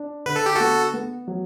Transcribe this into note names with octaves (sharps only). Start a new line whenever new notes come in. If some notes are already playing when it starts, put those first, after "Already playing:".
Already playing: D4
D3 B4
A4
G4
B3 F#4 A4
B3
F#3